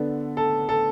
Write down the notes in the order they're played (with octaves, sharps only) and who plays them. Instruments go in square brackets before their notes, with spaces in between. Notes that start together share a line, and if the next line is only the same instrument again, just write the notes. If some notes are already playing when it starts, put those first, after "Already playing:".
Already playing: [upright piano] D3 B3 D4 A4
[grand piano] A4
A4